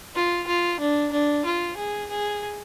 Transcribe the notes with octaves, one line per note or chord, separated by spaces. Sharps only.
F4
F4
D4
D4
F4
G#4
G#4